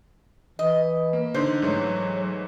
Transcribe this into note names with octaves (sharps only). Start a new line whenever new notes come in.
E3 D#5
A#3
D3 D4 D#4 C5
G#2 E3 F#3 A3